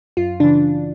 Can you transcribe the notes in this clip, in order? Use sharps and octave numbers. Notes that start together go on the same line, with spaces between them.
F#2 F4
C#3 E3 D4